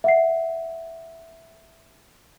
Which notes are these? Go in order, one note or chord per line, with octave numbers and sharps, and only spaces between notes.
E5 F#5 C7